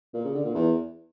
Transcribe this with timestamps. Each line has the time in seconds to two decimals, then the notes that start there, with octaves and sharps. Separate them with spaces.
0.14 A#2
0.24 C#3
0.34 D3
0.45 A#2
0.55 E2